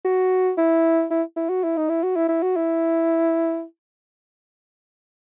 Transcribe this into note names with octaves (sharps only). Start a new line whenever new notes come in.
F#4
E4
E4
E4
F#4
E4
D#4
E4
F#4
E4
E4
F#4
E4